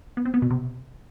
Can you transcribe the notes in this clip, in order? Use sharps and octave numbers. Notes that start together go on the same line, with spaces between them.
B3
C4
B3
B2
C3